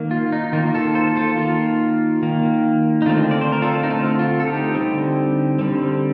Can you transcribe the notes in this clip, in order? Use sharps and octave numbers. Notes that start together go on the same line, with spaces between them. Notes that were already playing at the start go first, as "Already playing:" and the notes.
Already playing: D#3 A#3
F4
D#4
D#3 A#3 F4
F4 A4
A4 C5
F4 A4
D#3 A#3 F4
D#3 A#3
D#4
D3 A3 C4 F4
D5
C5
A#4
F4 A4
D#4
D3 A3 C4 F4
F4
A4
D#4 G4
D3 G3 C4
D3 G3 C4